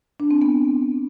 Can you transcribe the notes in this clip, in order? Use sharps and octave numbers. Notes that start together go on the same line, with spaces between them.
D4
C4
B3